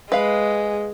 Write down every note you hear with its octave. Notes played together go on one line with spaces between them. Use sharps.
G#3 B4 F5